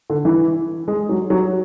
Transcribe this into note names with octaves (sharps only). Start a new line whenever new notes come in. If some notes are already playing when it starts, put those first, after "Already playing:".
D3
E3
G#3
F#3
F#3